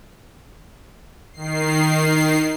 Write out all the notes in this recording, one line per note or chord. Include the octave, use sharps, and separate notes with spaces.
D#3 C7